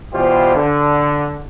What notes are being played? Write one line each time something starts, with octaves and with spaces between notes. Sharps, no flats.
B2 E3 G3 F4 G4 C5
D3